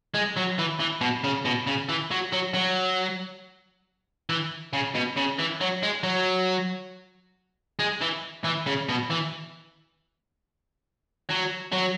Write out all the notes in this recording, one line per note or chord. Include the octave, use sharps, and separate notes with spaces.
G#3
F#3
E3
E3
B2
C#3
B2
C#3
E3
F#3
F#3
F#3
E3
C#3
B2
C#3
E3
F#3
G#3
F#3
G#3
E3
E3
C#3
B2
E3
F#3
F#3